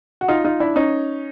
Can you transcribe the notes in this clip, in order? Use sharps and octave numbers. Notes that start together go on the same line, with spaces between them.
F#4
D#4 F4
D#4 F4
D4 E4
C#4 D#4